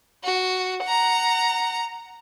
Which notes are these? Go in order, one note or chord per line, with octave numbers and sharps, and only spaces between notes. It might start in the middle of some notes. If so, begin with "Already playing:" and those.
F#4
F#5 A#5